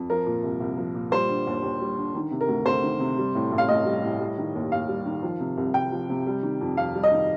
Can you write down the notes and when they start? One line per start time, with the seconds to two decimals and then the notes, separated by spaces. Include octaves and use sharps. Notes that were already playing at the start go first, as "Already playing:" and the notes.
Already playing: F2
0.10 F3 A#4
0.26 A#2
0.43 C2
0.60 C2
0.77 F3
0.95 A#2
1.11 G3 C5
1.29 D3
1.47 D#2
1.63 D#2
1.81 G3
1.97 D3
2.14 D#3
2.31 C3
2.41 A#4
2.48 D2
2.66 D2 C5
2.83 D#3
3.00 C3
3.18 G3
3.35 A2
3.52 A1
3.58 F5
3.68 A1 D#5
3.86 G3
4.03 A2
4.20 G3
4.38 D#3
4.55 D#2
4.72 D#2 F5
4.88 G3
5.06 D#3
5.23 F3
5.40 C3
5.57 C2
5.74 C2 G5
5.92 F3
6.10 C3
6.27 G3
6.43 D#3
6.61 F2
6.77 F2 F5
6.95 G3
7.03 D#5
7.12 D#3